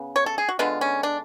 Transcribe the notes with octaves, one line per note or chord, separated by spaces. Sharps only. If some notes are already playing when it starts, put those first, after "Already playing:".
Already playing: C#3 B3
C#5
A4
G#4
F#4
D3 G#3 B3 F4
C#4
D4